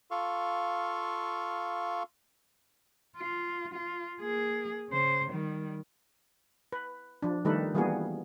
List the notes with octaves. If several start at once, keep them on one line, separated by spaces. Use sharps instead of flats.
F4 A4 F5 C#6
F4
F4
A#3 G#4
C#3 C5
D#3 G3
B4
F3 D4
D#3 G3 A3 D#4 A4 B4
E3 G3 A#3 B3 F#4 G#4